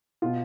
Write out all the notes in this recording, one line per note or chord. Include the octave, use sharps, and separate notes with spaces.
B2 B3 F4